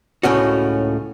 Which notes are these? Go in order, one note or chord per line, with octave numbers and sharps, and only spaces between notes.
C#2 A2 C#4 F#4